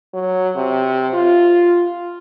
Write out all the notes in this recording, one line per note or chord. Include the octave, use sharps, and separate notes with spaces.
F#3
C3
F4